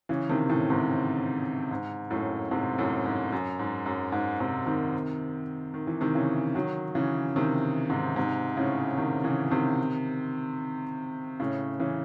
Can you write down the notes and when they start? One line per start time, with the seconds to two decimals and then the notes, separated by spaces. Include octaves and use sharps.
0.09 C#3 E3
0.29 C3 D#3
0.49 A2 C#3
0.70 G#2 C3
1.71 G#2
2.10 F#2 A2
2.51 G#2 C3
2.78 F#2 A2
3.06 G#2
3.32 F#2
3.59 G#2
3.86 F#2
4.12 G#2
4.40 G#2 C3
4.66 C3 D#3
5.74 D#3
5.87 E3
6.01 C3 D#3
6.15 C#3 E3
6.55 D#3 F#3
6.95 C#3 E3
7.36 C3 D#3
7.90 G#2 C3
8.16 G#2 C3
8.57 A2 C#3
8.97 C3 D#3
9.24 C#3 E3
9.51 C3 D#3
11.40 A2 C#3
11.80 C#3 E3